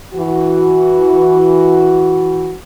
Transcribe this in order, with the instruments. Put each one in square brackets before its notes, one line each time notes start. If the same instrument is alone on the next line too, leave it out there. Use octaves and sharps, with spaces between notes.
[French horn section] E3 F#4